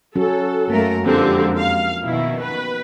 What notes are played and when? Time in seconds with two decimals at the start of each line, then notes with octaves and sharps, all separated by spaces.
0.16 F#3 C#4 F#4 A4
0.70 F#2 A3 A#3 A#4
1.06 F2 D3 F3 G#3 A#3 C4 G4
1.58 F5
2.04 B2 D#3 E4
2.40 B4